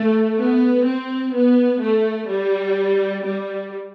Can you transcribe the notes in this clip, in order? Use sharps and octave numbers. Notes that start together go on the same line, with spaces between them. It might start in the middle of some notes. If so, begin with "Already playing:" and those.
Already playing: A3
B3
C4
B3
A3
G3
G3